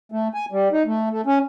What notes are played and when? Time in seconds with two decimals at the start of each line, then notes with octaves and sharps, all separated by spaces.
0.12 A3
0.34 G#5
0.52 G3
0.72 D#4
0.86 A3
1.10 A3
1.26 C#4